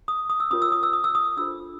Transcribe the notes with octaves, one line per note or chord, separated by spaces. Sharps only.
D#6
D#6
E6
C#4 F4 A#4 C#5 D#6
E6
D#6
E6
D#6
E6
D#6
D4 F4 A4 C5 E6